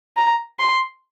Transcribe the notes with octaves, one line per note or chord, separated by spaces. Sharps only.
A#5
C6